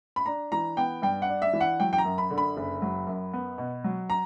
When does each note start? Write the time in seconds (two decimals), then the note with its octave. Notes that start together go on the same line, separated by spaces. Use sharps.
0.16 B5
0.26 D4 A#5
0.52 E3 A#5
0.77 B3 G5
1.02 G2 G5
1.22 F#5
1.29 D4
1.42 E5
1.53 E3
1.61 F#5
1.80 F#3 G5
1.93 G5
1.98 A#5
2.05 F#2
2.18 B5
2.30 D3
2.38 B5
2.57 F#1
2.82 F#3
3.07 F#2
3.33 B3
3.58 B2
3.84 F#3
4.10 A#5